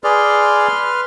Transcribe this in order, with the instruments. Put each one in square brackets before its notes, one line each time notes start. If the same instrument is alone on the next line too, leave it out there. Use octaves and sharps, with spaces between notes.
[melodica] G#4 D5 [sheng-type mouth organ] B4 C6 F6